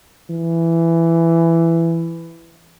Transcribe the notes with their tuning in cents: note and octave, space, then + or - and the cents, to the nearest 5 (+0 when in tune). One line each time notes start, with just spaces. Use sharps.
E3 +10